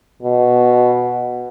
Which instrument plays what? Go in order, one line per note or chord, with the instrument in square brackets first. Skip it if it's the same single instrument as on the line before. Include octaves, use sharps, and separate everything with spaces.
[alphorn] B2